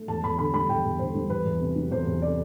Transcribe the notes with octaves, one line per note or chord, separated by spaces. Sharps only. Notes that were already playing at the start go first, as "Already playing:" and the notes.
Already playing: A3
E2 A5
E2 B5
D3 B5
G3 B5
E2 G5
E2
D3 C5
G3
E2 B4
E2
C3
F#3
E2 C5
E2
C3 D5